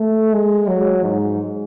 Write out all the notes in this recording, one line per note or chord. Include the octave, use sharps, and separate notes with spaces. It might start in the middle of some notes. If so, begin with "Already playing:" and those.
Already playing: A3
G#3
F#3
G#2